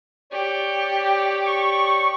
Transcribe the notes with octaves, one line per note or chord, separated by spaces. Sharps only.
G4 C#5 D5
C#6